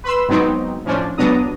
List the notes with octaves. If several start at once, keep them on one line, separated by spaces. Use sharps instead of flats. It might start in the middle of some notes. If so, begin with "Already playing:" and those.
B4 B5 C6 E6
G#2 F#3 B3 C4 D#4
A2 F3 C#4 D4
C#2 F#3 B3 D4 A#5 D#6